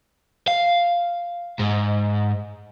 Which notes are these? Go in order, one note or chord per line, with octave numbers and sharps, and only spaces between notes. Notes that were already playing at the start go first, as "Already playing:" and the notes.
F5
G#2